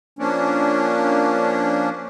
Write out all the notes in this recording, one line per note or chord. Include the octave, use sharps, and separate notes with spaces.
F3 A#3 C#4 D4